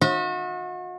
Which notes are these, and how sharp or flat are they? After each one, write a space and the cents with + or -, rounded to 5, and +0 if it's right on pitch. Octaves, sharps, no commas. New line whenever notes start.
F#4 -40 E5 -45